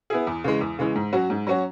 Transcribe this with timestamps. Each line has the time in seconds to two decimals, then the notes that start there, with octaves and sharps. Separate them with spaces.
0.10 B3 E4 G#4
0.27 E2
0.44 C#3 E3 G#3
0.61 E2
0.79 C#3 E3 G#3
0.95 G#2
1.13 F#3 C#4 F#4
1.30 G#2
1.47 F#3 C#4 F#4